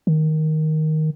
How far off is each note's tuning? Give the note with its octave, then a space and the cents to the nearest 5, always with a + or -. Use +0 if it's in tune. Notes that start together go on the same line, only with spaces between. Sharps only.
D#3 +5